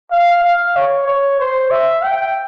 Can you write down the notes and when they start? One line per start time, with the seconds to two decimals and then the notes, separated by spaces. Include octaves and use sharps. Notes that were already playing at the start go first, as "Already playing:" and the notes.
0.11 F5
0.43 F5
0.76 C#5
1.07 C#5
1.40 C5
1.71 E5
2.03 G5